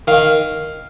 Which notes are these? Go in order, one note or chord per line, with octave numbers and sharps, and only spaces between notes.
D#3 F5